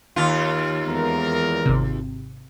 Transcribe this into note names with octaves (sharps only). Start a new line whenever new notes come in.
D#2 F4
E2 G#3 A#4
G#1 C3